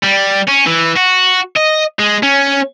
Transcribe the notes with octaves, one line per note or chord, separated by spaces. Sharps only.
G3
C#4
E3
F#4
D#5
G#3
C#4